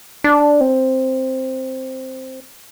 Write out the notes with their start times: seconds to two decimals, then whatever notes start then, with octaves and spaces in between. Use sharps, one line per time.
0.24 D4
0.61 C4